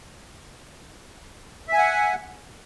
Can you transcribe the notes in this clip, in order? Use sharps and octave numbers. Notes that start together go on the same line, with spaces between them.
E5 F#5 G#5